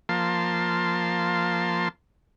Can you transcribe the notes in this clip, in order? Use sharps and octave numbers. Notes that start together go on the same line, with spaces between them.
F3 A#3 A5 C6